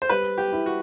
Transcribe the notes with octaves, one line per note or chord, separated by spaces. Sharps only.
C5
G3 B4
G4
E4
F#4